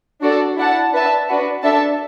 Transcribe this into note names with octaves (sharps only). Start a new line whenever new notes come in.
D4 F#4 A4 D5
E4 D5 F#5 A5
D4 B4 E5 A5
D4 F#4 B4
D4 A4 E5 A5